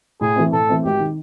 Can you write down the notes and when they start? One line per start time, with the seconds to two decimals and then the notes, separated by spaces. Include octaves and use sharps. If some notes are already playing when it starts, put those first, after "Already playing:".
0.21 A2 G#4
0.36 E3 A3 C4
0.52 A2 A4
0.69 E3 A3 C4
0.84 G#1 G4
1.00 D#3